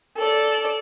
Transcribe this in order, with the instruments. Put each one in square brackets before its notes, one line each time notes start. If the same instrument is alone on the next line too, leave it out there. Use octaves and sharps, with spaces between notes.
[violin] A4 D5